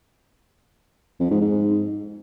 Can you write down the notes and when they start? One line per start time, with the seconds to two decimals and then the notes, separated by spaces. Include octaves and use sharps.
1.20 F2
1.30 G#2
1.41 G#2